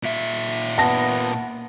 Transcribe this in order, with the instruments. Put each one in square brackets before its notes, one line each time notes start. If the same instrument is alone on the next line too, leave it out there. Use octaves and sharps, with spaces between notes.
[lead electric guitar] A#2 E5
[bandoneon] B3 [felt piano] A5 A#6